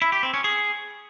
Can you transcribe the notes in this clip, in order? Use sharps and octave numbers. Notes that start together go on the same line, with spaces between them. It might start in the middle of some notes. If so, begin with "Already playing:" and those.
E4
G4
C4
C#4
G#4